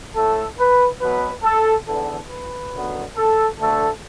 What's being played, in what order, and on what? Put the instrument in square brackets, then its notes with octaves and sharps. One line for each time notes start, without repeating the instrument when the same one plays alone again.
[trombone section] A2 A3 A4
B4
B2 F#3 B3 B4
A4
E2 D3 B3 A4
B4
F#2 D3 F#3 B3
A4
D2 D3 A3 A4